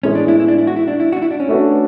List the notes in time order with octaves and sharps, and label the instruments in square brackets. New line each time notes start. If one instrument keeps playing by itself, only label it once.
[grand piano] A2 E3 G#3 B3 [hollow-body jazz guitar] C#4
[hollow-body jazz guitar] D4
E4
E4
D4
E4
F#4
E4
D4
E4
F#4
D4
E4
D4
C#4
[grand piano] A3 D4 F#4 B4